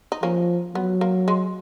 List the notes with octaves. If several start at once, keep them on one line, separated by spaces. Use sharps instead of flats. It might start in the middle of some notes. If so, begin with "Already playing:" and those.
D#4
F3 A#3 C#4
F#3 B3
A#3
G#3